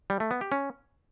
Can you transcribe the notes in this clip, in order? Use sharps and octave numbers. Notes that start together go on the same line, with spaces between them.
G3
A3
B3
G4
C#4